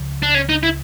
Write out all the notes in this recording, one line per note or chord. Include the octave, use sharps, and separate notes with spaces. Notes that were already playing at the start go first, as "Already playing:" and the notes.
Already playing: C#2 C#3 F3 A3
D4
C#4
D#4
E4